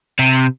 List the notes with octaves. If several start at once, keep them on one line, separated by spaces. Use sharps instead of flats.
C3